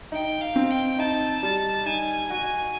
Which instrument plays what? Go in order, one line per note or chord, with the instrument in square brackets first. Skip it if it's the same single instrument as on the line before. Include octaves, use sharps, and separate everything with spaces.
[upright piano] D#4 [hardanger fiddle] G5
[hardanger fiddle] F5
[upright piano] C4
[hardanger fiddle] G5
[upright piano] D#4 [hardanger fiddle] A5
[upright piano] G3 [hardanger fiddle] A5
[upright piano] D#4 [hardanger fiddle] G#5
[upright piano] F#4 [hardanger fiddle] G#5